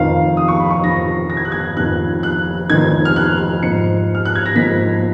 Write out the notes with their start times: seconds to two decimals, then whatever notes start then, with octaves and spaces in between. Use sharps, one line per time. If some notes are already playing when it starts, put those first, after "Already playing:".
Already playing: F1 F2 D#3 F5
0.37 D#6
0.48 C#6
0.60 B5
0.71 C#6
0.83 F1 F2 D#3 A#6
1.30 A#6
1.37 G#6
1.45 F#6
1.52 G#6
1.76 F1 F2 D#3 F#6
2.23 F#6
2.70 F1 F2 D#3 G#6
3.05 F6
3.16 F#6
3.63 G#2 F3 A#3 C#7
4.15 F6
4.25 F#6
4.35 G#6
4.46 A#6
4.55 G#2 F3 A#3 B6